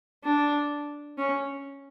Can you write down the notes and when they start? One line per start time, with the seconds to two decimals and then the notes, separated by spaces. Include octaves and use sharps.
0.24 D4
1.18 C#4